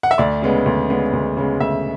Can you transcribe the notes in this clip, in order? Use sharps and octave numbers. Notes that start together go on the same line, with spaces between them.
F#5
E5
D2 D5
C#3 G#3 B3
D2
C#3 G#3 B3
D2
C#3 G#3 B3
D2 E5